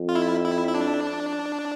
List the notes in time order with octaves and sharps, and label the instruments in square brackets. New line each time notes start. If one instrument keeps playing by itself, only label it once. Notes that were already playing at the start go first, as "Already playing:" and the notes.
Already playing: [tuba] F2
[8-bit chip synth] F4
E4
E4
E4
D4